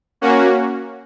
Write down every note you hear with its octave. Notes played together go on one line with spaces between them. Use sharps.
A#3 C#4 F#4